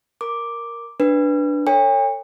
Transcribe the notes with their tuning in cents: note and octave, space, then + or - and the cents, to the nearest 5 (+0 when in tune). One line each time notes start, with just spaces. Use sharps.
A#4 +0 D6 +0
D4 +0 B4 +0
A4 +45 C#5 +0 G5 +45